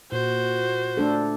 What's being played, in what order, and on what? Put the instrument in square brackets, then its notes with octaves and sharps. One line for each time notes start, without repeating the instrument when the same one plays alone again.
[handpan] A#2 [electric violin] F#4 C5
[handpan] A3 D4 A4